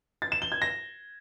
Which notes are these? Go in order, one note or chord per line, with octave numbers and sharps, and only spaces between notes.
A6
E7
G7
G#6
A#6